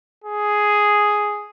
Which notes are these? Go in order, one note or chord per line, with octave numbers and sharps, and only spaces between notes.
G#4